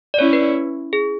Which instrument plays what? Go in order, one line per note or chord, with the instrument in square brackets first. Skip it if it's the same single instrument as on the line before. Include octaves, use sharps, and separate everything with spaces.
[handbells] D5
[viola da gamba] C#4 E4 [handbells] C#5
[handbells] B4
G#4